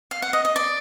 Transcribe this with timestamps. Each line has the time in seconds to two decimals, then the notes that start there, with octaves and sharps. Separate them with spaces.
0.11 F5
0.22 F#5
0.33 D#5
0.45 D#5
0.56 D5